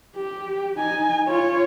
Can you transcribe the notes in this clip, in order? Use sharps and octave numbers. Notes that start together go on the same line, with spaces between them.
G4
D#4 G#5
F4 C#5